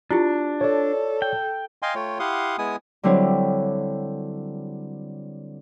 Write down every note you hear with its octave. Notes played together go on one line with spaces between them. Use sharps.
D4 E4 F4 G4
A4 C#5 D5
G5
D#5 F5 G5 G#5 C6
A3 F4 C#5 G5
E4 G4 F5 F#5 C6 D#6
G#3 B3 E4 G#5 D#6
D3 F#3 G3 C4 E4 C#5